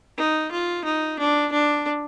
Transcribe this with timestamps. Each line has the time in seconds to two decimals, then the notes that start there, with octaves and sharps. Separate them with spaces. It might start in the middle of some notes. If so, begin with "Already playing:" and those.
0.18 D#4
0.52 F4
0.85 D#4
1.19 D4
1.52 D4